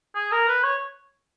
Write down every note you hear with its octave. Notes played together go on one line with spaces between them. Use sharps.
G#4
A#4
B4
C#5